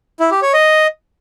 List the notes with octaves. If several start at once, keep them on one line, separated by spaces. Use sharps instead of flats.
E4
G4
C#5
D#5